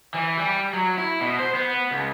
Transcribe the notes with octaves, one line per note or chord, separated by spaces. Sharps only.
E3
G3
F#3
E4
B2
C5
B3
C#2